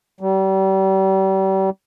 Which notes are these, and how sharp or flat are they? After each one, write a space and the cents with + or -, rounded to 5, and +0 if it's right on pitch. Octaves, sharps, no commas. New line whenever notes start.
G3 -35